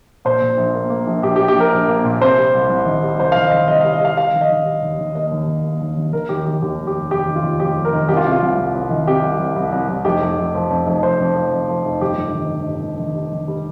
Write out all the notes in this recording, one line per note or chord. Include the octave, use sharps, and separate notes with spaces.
A#2 C5
A#2
A#1
A#3
A#3
A#1
A#1 G4
G4
A#3
G4
A#1 A#4
A#1
A#3
A#2
C3 C5
G3
C2
C2
D#3
G3
C2 C5
D#3 F5
D#5
D#3
C2 D#5
G3 F5
D#5
G3 F5
G3 F5
D#3
D#5
D#3
G3
D#2
D#3
A#3 D#5
D#2
D#2
A#3
D#2
D#3
D#3 A#4
D#2 G4
D#3 G4
D#2 G4
F1
G4
F1
F1 G4
D#3
F4
D#2
F1 G4
F1
A#4
D#3
C2 G4
F4
C3
F4
C2
C2
C2
D#3
C3 G4
C2
C2
C2
C2
C2
F1 G4
F1
F1
F3
F2
F1
F1 C5
F2
F3
F2
F3
F1
G1 G4
G1
D#3
G1
G2
G2
D#3
G3
D#3
G3